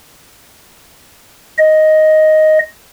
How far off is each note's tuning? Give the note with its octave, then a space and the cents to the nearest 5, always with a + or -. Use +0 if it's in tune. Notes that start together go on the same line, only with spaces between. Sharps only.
D#5 +5